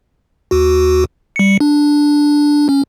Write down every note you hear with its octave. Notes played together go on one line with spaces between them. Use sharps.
D#2 F#4
G3 C#7
D4
C#4